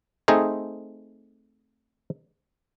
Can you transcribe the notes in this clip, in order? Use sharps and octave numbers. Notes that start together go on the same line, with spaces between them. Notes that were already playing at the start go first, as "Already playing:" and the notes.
A3 C4 D#4 G#4 C5 D#5